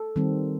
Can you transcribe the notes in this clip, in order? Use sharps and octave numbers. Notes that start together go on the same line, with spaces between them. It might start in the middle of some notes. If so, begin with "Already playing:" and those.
Already playing: A4
D#3 G3 C4